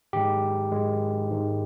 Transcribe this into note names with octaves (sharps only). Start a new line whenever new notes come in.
G#2 D#3 G#3 G4
G#2 D#3 G#3
G#2 D#3 G#3